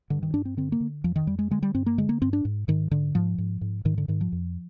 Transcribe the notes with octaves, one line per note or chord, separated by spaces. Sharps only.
G2 D3
D#3
G2 D4
C4
D3 C4
A#3
D3
F2 F3
D#3
F2 G3
G#3
D3 G#3
G3
G2 C4
A#3
D3 G#3
A#3
G2 C4
D4
G#2
G#2 D#3
G#2 D3
G#2 F3
G#2
G#2
G#2 D#3
D3
G#2 D#3
F3
F2